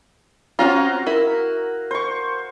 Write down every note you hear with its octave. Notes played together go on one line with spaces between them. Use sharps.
C4 C#4 F4 F#4 F5 A#5
E4 A#4
C5 C#6